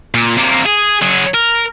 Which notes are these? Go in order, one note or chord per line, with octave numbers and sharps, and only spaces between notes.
A#2
C3 A#3
G#4
F#3 G#4
A#4